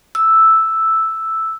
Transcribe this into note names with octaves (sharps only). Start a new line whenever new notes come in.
E6